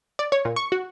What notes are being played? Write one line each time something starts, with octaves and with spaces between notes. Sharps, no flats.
D5
C#5
A#2
C#6
F#4